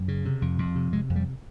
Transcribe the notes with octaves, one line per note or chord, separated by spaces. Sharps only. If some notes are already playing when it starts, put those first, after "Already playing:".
Already playing: F#2
C#3
C3
F2
F2
C3
C3 G#3
F2
G3